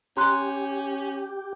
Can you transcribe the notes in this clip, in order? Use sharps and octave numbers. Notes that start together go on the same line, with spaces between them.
C#4 G4 A#5 C6 F#6